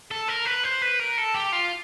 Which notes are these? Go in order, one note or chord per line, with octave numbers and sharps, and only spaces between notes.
A4
A#4
B4
C5
B4
A#4
A4
G4
F4